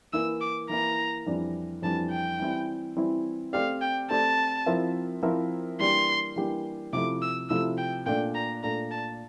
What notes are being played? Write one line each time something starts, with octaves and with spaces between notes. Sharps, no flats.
E3 A#3 E4 E6
D6
E3 A#3 E4 A#5
F2 E3 G3 D4
F2 E3 G3 D4 A5
G5
E3 G3 C4 E4
E3 G3 C4 E4
A3 C4 G4 D5 F5
G5
A3 C4 G4 D5 A5
F3 C4 E4 A#4 E5
F3 C4 E4 A#4 E5
E3 G3 A#3 D4 G4 C6
E3 G3 A#3 D4 G4
C3 F3 A3 E4 D6
E6
C3 F3 A3 E4 E6
G5
A#2 A3 D4 G5
A#5
A#2 A3 D4 A#5
A5